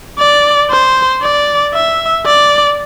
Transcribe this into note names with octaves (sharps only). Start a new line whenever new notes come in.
D5
C5
D5
E5
D5